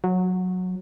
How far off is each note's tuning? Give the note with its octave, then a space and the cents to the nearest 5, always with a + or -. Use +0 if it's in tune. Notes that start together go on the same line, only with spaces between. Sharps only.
F#3 -15